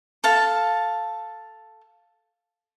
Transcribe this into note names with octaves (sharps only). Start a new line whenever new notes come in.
A4 F5 A5